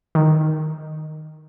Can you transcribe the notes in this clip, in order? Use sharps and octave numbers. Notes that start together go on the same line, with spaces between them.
D#3